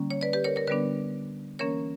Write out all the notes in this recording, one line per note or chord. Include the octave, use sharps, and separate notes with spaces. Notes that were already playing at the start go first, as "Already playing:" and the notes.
Already playing: D3 G3 A#3 C#4
C#5
B4 D5
G4 B4
A#4 C#5
A#4 C#5
D3 G3 B3 D4 B4 D5
E3 A#3 C#4 A#4 C#5